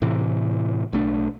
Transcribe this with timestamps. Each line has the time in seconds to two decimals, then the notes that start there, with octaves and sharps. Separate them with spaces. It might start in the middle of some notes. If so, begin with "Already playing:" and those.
0.02 A2 C3 E3
0.93 B1 A3 D4